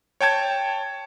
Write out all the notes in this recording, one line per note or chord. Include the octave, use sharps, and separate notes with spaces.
C#5 G5 A5 G#6